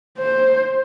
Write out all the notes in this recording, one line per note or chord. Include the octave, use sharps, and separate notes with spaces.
C5